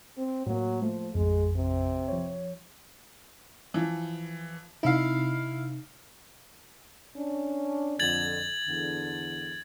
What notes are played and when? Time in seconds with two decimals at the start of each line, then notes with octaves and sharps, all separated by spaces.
0.17 C4
0.46 A2 F#3 A#3
0.82 F3 A3
1.15 A1 F2 G#3
1.56 C3
2.08 F3 C#5
3.74 E3 F3
4.83 C3 D#4 E4 F5
7.16 C#4 D4
7.99 F2 D3 G#6 A6 F#7
8.67 E2 D3